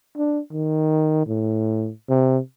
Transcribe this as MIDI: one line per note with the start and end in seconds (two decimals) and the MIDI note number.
0.17 0.39 62
0.53 1.25 51
1.27 1.90 45
2.09 2.38 48